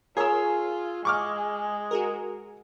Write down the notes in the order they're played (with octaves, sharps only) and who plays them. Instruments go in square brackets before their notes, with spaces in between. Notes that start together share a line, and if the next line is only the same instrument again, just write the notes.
[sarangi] F4 [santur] G#4 E6 [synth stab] A#4 C#5
[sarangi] G#3 [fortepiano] C#6 D6 F6
[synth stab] F#4 G#4 A#4